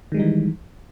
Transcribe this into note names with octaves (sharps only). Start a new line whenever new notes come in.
D#3 E3 G3 G#3 D#4